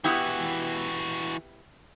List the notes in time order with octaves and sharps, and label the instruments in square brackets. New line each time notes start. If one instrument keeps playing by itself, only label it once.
[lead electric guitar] E3 F#4 [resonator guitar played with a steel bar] B3 E4 G4